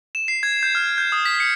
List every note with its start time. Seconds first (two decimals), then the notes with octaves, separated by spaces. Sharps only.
0.15 E7
0.28 C7
0.43 G#6
0.63 G6
0.75 F6
0.98 G6
1.12 D#6
1.26 B6
1.40 C#7